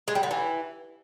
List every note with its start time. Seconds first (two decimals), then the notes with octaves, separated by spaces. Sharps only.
0.08 G#3
0.15 G3
0.23 D3
0.31 E3